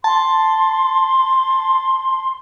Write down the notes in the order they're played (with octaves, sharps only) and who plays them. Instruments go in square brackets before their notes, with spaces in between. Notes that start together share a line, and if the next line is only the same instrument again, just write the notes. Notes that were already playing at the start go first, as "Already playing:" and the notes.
[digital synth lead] A5 [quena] C6